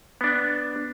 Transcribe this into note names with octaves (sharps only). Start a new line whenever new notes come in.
B3 D4